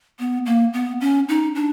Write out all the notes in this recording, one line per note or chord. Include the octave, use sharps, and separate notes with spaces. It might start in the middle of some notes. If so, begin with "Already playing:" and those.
B3
A#3
B3
C#4
D#4
D4